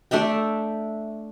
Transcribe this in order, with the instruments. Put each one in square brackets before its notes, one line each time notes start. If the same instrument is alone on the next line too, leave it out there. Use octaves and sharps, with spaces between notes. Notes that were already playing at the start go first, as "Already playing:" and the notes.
[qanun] A3 D4 E5 G5